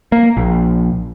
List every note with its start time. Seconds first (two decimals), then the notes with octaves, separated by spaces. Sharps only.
0.12 A#3
0.37 A#1